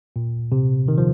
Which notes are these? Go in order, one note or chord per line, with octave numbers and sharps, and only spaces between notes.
A#2
C3
D#3
F3